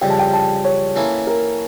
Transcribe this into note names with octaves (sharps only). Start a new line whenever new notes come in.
F2 C#3 G3 G5
A5
G5
A5
C#5
E3 A#3 C#4 E4 A4
A#4